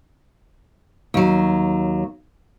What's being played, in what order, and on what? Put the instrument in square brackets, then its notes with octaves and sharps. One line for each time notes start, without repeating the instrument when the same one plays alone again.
[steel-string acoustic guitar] D#2 F#3